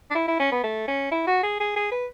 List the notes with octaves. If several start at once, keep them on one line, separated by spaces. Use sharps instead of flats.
D4
E4
E4
C#4
B3
A3
C#4
E4
F#4
G#4
G#4
G#4
B4